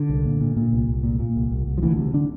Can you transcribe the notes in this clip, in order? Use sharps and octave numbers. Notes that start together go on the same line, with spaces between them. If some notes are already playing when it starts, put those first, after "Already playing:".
Already playing: D3
C2
A#2
A#2
A#2
C2
C2
A#2
A#2
C2
C2
C2
F3
D2 E3
C3
D3 D4